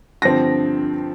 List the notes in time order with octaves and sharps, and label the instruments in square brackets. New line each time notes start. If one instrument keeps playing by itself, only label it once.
[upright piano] G2 D3 F3 C4 A#6